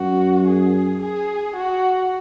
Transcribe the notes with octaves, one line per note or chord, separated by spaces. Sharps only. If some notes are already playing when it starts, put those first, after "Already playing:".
Already playing: F#2 F#4
G#4
G#4
F#4